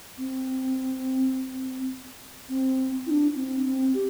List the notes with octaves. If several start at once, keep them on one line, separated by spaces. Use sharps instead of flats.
C4
C4
E4
D4
C4
C4
G4